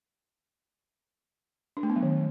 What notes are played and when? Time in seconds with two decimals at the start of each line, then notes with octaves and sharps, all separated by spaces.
1.77 D4
1.83 A3
1.90 B3
1.96 F#3
2.03 D#3